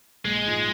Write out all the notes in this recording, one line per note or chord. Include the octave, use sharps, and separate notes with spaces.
A#1 G#3
G#2 F3